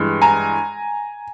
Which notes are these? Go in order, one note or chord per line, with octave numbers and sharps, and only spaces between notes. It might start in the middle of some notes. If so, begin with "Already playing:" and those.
Already playing: G2 E3 G#3
G#5 A#5